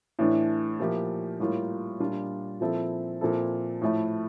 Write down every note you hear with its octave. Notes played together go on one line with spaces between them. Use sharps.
A2 E3 A3 D4
A#2 F3 A#3 E4 G4
A2 G3 A#3 F4
A#2 G3 D4 F4
A#2 F3 C4 E4 A4
A#2 F3 C4 E4 A4
A2 F3 A3 E4